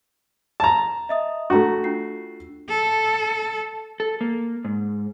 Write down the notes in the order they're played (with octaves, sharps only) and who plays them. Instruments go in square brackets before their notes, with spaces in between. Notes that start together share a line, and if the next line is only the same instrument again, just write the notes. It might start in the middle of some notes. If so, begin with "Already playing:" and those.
[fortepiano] A5 A#5
[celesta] D#5 E5 D#6
[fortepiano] A3 F#4 [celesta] D4 A#5
[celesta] D4 F4 C7
[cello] A4
[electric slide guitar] A4
A#3
G#2